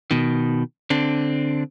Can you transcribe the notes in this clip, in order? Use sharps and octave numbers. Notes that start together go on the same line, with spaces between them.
B2 D#3
D3 C4 D4